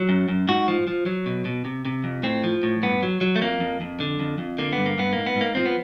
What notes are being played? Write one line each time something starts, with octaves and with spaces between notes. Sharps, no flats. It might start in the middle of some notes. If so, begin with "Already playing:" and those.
Already playing: F#3
F#2
F#2
G#2 F#4
F3
F3
F#3
B2
B2
C3
C3
F2
A2 C4
F3
A2
G2 B3
F#3
F#3
A3
F2 A#3
F2
F2
D3
F2
F2
D3 A#3
G2 B3
A#3
G2 B3
G#2 A#3
B3
G#2
A#3
F3 C4
B3